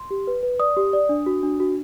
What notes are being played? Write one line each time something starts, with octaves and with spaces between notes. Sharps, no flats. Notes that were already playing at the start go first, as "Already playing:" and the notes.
Already playing: C6
G4
B4
B4
D5 D#6
G4
D5
D4
F#4
D4
F#4